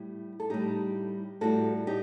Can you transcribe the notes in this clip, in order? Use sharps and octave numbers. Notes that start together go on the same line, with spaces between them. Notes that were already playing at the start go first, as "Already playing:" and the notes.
Already playing: A2 G3
A4
A2 G3 D#4 G4
A2 G3 F#4 A4
D#4 G4